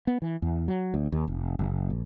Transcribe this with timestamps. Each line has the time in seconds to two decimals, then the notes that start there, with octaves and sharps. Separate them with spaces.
0.07 B3
0.22 E3
0.42 E2
0.68 F#3
0.94 D2
1.12 D#2
1.28 F1
1.59 F#1
1.90 A#1